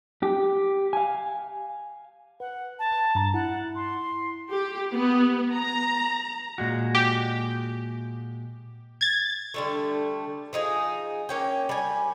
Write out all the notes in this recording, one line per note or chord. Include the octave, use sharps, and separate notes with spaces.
G4
F5 G#5
B4 F#5
A5
G2 A#5
E4 F#5
C6
G4
B3
A#5
A#2 G#3 F#4
G4
G#6 A6
D3 G3 A3
F3 D#4 E4 G#4
A#3 C#4 G5
G3 G#5